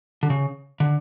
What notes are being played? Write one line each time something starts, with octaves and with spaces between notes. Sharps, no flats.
D3
C#3
D3